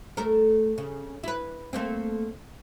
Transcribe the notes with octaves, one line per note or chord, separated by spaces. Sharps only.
A3 A4 A#4
C#3
E4 B4
A3 A#3 C4